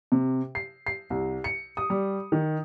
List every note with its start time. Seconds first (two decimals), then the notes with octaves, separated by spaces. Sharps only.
0.12 C3
0.55 C7
0.86 C7
1.10 C2
1.44 C#7
1.77 D#6
1.90 G3
2.32 D#3